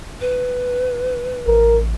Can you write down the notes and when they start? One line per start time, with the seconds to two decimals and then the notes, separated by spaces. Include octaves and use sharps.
0.21 B4
1.47 A1 A#4